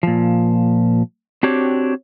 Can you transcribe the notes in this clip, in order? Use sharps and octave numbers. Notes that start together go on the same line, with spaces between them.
A#2 F3
C4 D4 F#4 G4 C#5